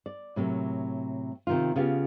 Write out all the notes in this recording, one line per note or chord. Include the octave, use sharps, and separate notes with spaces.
D5
A2 C3 F#3 A#3
C3 D#3 F4
C#3 B3 F4 G4